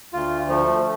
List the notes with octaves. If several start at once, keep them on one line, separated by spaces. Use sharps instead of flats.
D2 F4
F3 A3